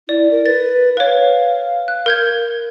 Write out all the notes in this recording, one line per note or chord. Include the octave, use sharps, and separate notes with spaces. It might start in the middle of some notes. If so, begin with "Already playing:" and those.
E4 D5
A#4
B4 A6
B4 C#5 F5
F#6
A#4 G6 G#6